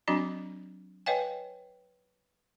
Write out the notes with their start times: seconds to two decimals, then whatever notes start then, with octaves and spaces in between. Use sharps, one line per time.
0.08 F#3 C4 D4 F#4 D#5 B5
1.06 B4 C#5 D#5 F5 G5 G#5